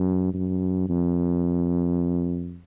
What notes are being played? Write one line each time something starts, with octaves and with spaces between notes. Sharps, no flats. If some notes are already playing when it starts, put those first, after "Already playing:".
Already playing: F#2
F#2
F2